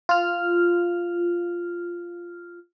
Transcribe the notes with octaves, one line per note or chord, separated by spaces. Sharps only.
F4 F6